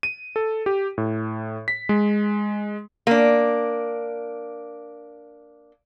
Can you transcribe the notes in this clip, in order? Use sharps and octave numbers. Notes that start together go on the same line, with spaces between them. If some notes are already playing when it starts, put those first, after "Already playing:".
D#7
A4
G4
A2
B6
G#3
A#3 D4